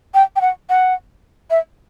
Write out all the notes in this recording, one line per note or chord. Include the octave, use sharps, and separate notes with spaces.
G5
G5
F#5
F#5
E5